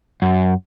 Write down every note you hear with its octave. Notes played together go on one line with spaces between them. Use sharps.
F#2